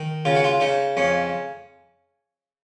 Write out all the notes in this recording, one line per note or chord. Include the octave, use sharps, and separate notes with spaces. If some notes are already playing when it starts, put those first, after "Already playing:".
Already playing: D#3
C#3 F4
F#4
F4
C#3 D#4
F2 C#4